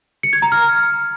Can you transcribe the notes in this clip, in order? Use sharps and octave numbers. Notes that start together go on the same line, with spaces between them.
C#7
G#6
A#5
F6